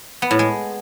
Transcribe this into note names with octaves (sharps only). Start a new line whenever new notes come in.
B3
A2
G#3